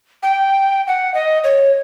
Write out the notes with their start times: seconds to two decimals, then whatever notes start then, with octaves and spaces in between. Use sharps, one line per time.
0.23 G5
0.87 F#5
1.14 D#5
1.44 C#5